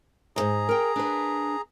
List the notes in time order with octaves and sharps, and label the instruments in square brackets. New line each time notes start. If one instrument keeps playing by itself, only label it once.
[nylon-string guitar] D#2 G#2 [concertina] G#4 A#5
[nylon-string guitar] A#4 G5
D4 B4